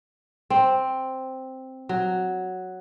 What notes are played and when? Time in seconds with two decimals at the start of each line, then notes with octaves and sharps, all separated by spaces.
0.50 C4
1.89 F#3